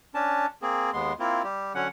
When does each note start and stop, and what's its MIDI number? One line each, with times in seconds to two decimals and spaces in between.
0.15 0.46 61
0.15 0.46 62
0.15 0.46 81
0.62 0.91 58
0.62 0.91 60
0.62 0.91 68
0.93 1.13 39
0.93 1.13 56
0.93 1.13 59
0.93 1.13 84
1.20 1.42 58
1.20 1.42 60
1.20 1.42 64
1.20 1.42 65
1.44 1.73 55
1.44 1.73 67
1.75 1.88 50
1.75 1.88 54
1.75 1.88 61
1.75 1.88 78